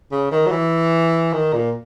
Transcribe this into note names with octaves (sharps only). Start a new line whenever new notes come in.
C#3
D#3
F#3
E3
D#3
A#2